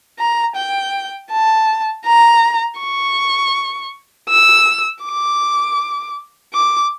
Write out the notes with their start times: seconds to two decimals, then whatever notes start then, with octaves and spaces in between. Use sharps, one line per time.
0.19 A#5
0.56 G5
1.31 A5
2.06 A#5
2.80 C#6
4.30 E6
5.04 D6
6.54 D6